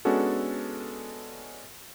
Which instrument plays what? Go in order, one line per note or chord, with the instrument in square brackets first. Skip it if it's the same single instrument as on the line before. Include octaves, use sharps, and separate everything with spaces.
[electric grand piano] G#3 B3 C#4 D4 F#4 A4